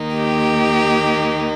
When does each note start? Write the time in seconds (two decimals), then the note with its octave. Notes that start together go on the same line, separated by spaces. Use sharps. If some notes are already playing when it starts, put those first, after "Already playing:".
Already playing: D#2 D#3 A#3 D#4
0.14 G4